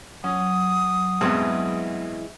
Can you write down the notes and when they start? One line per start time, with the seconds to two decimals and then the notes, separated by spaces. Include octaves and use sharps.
0.24 F#3 C#4 D#6
1.21 E2 G2 B2 E3 G#3 C4